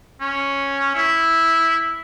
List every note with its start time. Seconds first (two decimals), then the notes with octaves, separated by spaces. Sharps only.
0.21 C#4
0.95 E4